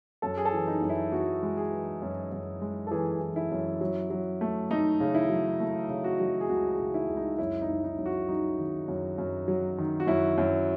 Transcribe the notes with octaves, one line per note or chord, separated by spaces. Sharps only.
F#2 A4
G#4
A4
E3
D#4
F#2
E4
F#2 F#4
G#3
G#4
E3
F#2
F#2
G#3
A4
E3 G#4
E3
E4
F#2
F#3
F#3
A3
A3 D#4
C#3
E4
F#3
A3
C#3
F#4
F#3
G#4
C#2 F#4
G#4
C#3
E4
C#2
D#4
F#2 E4
D#4
F#2
D#4
F#2
F#4
F#3 D#4
D#3
F#2
F#2
F#3
D#3
F#4
F#2 E4
F#2